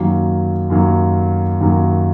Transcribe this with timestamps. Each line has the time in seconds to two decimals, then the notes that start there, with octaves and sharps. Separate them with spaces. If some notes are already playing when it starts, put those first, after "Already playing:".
Already playing: F#2 D#3 F#3 A#3
0.70 F#2 D#3 F#3 A#3
1.60 F#2 D#3 F#3 A#3